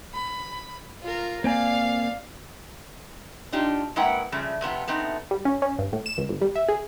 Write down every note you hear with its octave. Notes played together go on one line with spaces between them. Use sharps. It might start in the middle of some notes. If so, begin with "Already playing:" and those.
B5
F4 A#4
A#3 C4 D5 F5 G#5
D4 D#4 F4 G4
G#3 A#3 E4 B4 F#5 G5
C#3 F3 G3 A3
F2 C3 B3 F4
A3 B3 C4 D#4
G3
C#4
C#4
G2
A2
E7
C#2
G1
G3
E5
G#4